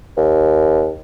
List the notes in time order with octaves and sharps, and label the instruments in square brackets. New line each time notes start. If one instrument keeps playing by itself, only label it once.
[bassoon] D#2